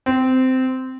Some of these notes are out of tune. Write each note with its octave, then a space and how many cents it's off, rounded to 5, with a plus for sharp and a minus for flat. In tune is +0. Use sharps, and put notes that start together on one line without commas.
C4 -15